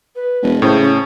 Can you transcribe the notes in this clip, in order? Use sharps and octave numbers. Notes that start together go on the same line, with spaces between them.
B4
E1
A2 C#3 C5
C#4